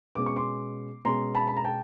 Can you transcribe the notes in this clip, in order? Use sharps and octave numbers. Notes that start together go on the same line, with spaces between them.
B2 G#3 C#4 D6
C#6
C6 D6
B2 G#3 C#4 A#5 C6
A5 B5
B5
A#5
G5 A5